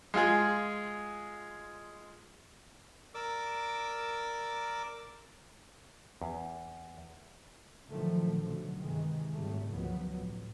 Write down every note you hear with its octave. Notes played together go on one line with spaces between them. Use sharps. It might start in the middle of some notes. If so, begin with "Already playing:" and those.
G#3 F4 G#4
A#4 D5 D6 E6
E2
A#2 D3 D#3 F3 F#3 A3
A1 B2 D3 F#3
G1 C3 D#3 E3 G#3
G#1 C#3 G3 A3
G1 C#2 D#3 F3 F#3 B3
A1